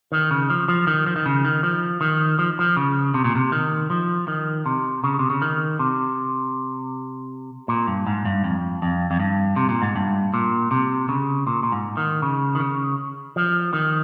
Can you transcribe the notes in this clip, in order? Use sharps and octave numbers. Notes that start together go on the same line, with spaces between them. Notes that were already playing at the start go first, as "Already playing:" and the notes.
D#3
C#3
F3
F3
D#3
F3
D#3
C#3
D#3
F3
D#3
F3
F3
C#3
C3
A#2
C3
D#3
F3
D#3
C3
C#3
C3
C#3
D#3
C3
A#2
G2
G#2
G2
F2
F2
F2
G2
C3
A#2
G#2
G2
A#2
C3
C#3
A#2
A#2
G#2
D#3
C#3
D#3
C#3
F3
D#3